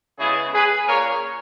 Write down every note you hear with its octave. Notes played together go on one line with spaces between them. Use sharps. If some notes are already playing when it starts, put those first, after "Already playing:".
C#3 G#3 B3 E4 G#4
G#4 B4
A#2 A#3 C#4 A#4 C#5